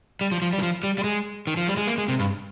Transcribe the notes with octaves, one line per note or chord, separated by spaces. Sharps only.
G3
F3
F3
G3
D#3
F3
G3
G3
G#3
D#3
F3
G3
G#3
A#3
G#3
C3
G2